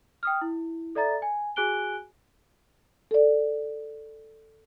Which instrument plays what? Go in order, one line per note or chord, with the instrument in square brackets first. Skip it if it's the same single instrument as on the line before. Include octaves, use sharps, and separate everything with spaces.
[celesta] G5 D#6 F6
E4
A4 D5 E5 A#5 A6
G#5
F#4 G#4 G#5 F#6 D7 G7
[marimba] A4 D5